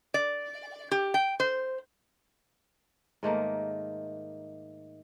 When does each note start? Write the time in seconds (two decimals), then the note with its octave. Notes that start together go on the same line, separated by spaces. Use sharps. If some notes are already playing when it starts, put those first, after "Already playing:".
0.14 D5
0.91 G4
1.14 G5
1.40 C5
3.23 G#2 D#3 A3 A#3